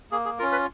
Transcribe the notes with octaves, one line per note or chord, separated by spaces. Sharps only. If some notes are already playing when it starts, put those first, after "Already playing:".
A#3 G#4
G#4
C#4 F4 A#4
B4